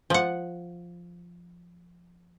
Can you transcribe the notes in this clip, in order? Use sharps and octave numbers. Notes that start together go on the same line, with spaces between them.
F3 F#5